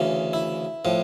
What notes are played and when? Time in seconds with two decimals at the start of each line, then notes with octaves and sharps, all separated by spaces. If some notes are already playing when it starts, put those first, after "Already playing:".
Already playing: D2 C#3 E3
0.33 E4
0.85 A2 F3